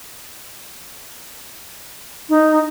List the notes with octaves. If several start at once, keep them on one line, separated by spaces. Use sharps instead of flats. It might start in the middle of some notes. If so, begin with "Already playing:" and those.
D#4